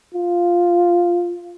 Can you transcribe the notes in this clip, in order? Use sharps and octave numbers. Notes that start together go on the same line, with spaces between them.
F4